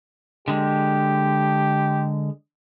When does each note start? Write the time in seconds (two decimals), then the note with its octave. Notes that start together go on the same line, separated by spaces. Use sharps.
0.48 D3 G#3 G4